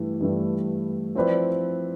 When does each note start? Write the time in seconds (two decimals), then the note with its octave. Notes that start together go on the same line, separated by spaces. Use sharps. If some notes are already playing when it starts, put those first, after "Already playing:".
Already playing: G2 E3 A3 E4 G4
0.20 G2 E3 A3 E4 G4
1.15 F3 C4 E4 B4 D5